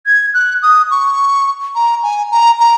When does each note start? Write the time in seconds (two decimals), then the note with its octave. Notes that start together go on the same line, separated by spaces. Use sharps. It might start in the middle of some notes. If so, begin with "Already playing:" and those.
0.07 G#6
0.34 F#6
0.63 D#6
0.91 C#6
1.75 A#5
2.03 G#5
2.32 A#5
2.60 A#5